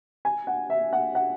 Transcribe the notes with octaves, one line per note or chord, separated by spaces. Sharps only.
G#5
F#5
E5
F#5
F#5